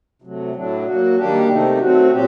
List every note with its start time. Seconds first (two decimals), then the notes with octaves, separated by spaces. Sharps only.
0.22 C3 F#3 A3
0.54 A2 F#3 A3 D4
0.85 F#3 A#3 F#4
1.17 D#3 G3 A#3 D4 G4
1.49 C3 D#3 A3 D#4
1.80 F#3 A3 C4 F#4
2.11 A#2 F#3 C4 G4